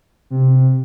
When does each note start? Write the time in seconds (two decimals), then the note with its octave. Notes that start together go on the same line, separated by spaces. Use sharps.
0.30 C3